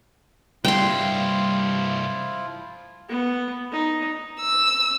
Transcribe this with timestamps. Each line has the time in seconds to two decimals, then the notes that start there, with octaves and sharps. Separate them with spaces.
0.65 C2 G2 F3 G3 E4 F4 G5 C6
3.09 B3
3.72 D#4
4.41 E6